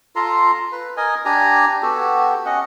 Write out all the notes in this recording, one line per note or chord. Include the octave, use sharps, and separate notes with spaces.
F4 A4 A#5 C6
B4
A#4 D#5 G#5
D4 G4 G#5 A#5
B3 F#4 G4 A4
C#4 D#5 F#5